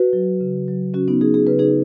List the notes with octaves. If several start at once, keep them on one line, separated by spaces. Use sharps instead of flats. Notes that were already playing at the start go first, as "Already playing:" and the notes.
Already playing: F#4 B4
F#3
C#3
F#3
C#3 C#4 F#4
B3 D#4
F#3 D#4 G#4
G#4
C#3 B4
D#4 G#4